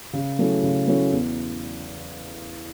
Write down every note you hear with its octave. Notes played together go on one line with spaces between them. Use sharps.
C#3
F#3 A3 C#4 E4
C#3
F#3 A3 C#4 E4
E2